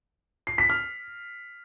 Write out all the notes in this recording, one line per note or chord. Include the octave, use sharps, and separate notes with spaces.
C7
B6
F6